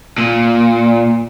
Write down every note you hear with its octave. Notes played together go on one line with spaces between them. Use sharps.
A#2